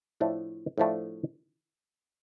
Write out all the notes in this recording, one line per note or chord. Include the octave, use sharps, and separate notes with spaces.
A2 F3 A3 D4
A2 F3 A3 D4